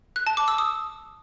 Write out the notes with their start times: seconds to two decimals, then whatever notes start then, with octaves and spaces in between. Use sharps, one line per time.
0.16 F#6
0.27 A5
0.37 D6
0.48 E6
0.58 D#6